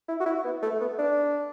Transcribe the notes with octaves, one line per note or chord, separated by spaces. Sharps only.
E4
F#4
E4
B3
A3
B3
D4